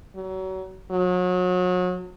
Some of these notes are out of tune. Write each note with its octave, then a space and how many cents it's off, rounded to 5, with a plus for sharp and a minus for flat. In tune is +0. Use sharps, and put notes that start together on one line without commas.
F#3 +30
F#3 -35